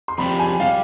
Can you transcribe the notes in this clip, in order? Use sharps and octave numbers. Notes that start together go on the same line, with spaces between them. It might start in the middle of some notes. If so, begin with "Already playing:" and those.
C6
F2 C3 G3 B5
G#5
C3 G3 F5